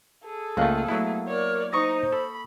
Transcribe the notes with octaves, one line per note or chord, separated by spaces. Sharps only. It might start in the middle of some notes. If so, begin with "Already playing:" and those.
G#4 A4
C#2 A3 A#3 F#6
F#3 A3 B3 E4
A#4 C#5 D5
D#4 C5 C#6 D#6 A#6
A4 B5